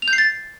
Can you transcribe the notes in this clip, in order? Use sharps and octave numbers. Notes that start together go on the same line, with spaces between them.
F7
G6
C7
A6